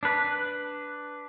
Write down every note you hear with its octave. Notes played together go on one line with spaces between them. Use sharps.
D4 B4